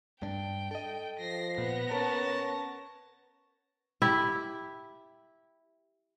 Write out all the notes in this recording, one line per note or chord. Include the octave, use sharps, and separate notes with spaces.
G2 D4 G5
A4 D#5
F3 A#6 C7
A#2 B3 A#6
C#4 A#4 C#5 A5
E4 G4